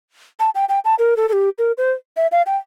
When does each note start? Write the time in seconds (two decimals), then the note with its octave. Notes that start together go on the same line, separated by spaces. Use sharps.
0.40 A5
0.55 G5
0.69 G5
0.85 A5
0.99 A#4
1.17 A4
1.29 A4
1.33 G4
1.58 A#4
1.78 C5
2.17 E5
2.32 F5
2.46 G5